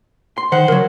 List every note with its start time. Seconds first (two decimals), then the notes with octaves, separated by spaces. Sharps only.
0.38 C6
0.52 D#3 C5 F#5
0.68 C#3 F#3 A#4